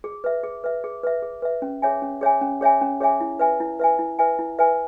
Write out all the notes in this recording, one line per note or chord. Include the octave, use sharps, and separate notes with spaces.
G#4
B4 E5
G#4
B4 E5
G#4
B4 E5
G#4
B4 E5
C#4
G#4 C#5 E5 G#5
C#4
G#4 C#5 E5 G#5
C#4
G#4 C#5 E5 G#5
C#4
G#4 C#5 E5 G#5
E4
B4 E5 G#5
E4
B4 E5 G#5
E4
B4 E5 G#5
E4
B4 E5 G#5